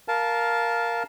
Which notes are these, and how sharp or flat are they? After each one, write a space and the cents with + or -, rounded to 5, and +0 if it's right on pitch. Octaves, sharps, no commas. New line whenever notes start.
A#4 +0 F5 +0 A5 -15